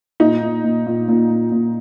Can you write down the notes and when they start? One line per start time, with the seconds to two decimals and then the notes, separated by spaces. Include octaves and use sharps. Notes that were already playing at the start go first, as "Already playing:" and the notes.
0.20 A#2 D#4
0.42 A#2
0.64 A#2
0.86 A#2
1.08 A#2
1.31 A#2
1.52 A#2